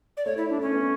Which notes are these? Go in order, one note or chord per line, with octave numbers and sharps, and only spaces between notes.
D5
A3 C#5
E4
D4
A3 C#4
B3